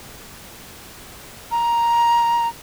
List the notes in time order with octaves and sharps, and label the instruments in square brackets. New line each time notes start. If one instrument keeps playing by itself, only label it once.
[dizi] A#5